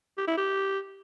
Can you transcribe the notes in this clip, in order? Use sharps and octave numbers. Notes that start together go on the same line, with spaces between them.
G4
E4
G4